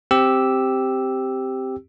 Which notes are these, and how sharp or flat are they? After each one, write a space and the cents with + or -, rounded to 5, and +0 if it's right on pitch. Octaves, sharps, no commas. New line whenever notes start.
C4 +0 G4 +0 E6 +0